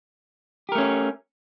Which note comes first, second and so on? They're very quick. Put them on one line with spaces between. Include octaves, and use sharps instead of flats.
G4 A#4 A3 C#4